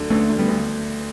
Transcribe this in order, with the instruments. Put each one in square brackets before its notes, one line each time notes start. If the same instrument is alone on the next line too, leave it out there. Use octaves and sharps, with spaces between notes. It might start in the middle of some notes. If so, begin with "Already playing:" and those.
Already playing: [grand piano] D2 D3 F#3
[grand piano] D2 [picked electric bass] A3 C#4
[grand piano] D3
[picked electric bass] G3 B3
[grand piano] D2